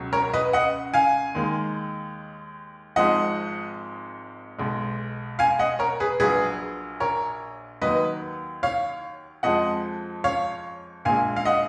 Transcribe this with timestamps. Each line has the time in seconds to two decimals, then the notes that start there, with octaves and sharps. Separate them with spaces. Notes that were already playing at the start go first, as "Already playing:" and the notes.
Already playing: C#2 B2 F#3
0.13 A#4 C#5
0.33 B4 D#5
0.53 D#5 F#5
0.94 F5 G#5
1.35 D#2 D#3 G#3
2.96 G#1 G#2 F3 G#3 D#5 F#5
4.58 B1 B2 G#3
5.39 F5 G#5
5.59 D#5 F#5
5.79 A#4 C#5
6.00 G#4 B4
6.20 A#1 A#2 F#3 G#4 B4
7.00 A#4 C#5
7.82 D#2 D#3 F#3 B4 D#5
8.63 C#5 F5
9.43 F2 F3 G#3 D#5 F#5
10.24 C#5 F5
11.05 A#1 A#2 G#3 F5 G#5
11.36 F5
11.45 D#5 F#5